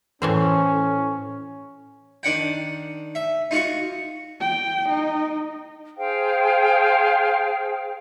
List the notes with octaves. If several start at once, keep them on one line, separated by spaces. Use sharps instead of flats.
A2 E3 C#4 C5
D#3 D4 F#5 G5
E5
D#4 F4 F#4 C#6
G5
D#4
G#4 C5 F5 G5